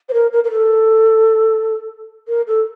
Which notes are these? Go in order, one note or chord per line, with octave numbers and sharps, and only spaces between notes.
C5
A#4
A#4
A#4
A4
A#4
A4